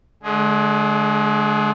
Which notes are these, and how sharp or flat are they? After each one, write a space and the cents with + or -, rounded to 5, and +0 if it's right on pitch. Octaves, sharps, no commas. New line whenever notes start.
D3 +0 G#3 +35 G#4 +0